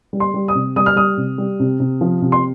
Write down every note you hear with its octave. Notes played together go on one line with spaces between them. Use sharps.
G3
C6
G3
D#6
C3
G3 D#6
F6
G3 D#6
C3
G3
C3
C3
F3
C3
C6